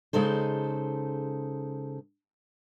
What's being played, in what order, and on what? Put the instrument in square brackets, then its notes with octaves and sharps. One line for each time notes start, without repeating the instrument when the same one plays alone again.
[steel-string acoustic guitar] C#3 G#3 D#4 A4 C5